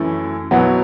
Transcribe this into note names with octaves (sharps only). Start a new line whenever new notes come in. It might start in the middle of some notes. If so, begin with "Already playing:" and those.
Already playing: F#2 E3 A3 E4
B2 F#3 B3 E4